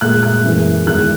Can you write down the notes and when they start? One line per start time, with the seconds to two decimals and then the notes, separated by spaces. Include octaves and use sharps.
0.01 A#2 G#3 F#6
0.23 F#6
0.44 F#2 E3 G#3
0.87 E2 D#3 G#3 F#6